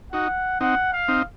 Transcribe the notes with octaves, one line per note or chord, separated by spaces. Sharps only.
D#4 F#4 F#5
C4 D#4 F#5
F5
C4 D#4